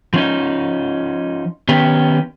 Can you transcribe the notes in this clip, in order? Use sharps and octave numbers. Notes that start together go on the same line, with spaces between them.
F3 C#4 D#4
D#3 B3 C#4 G4